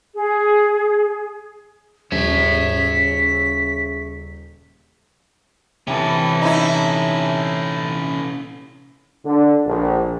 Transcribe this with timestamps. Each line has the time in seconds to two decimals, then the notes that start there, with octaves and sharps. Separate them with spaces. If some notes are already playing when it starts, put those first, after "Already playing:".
0.15 G#4
2.12 D#1 C#3 C#5 E5 B6
5.87 C3 E3 C#4 A4
6.42 D#4 E4
9.25 D3
9.66 A#1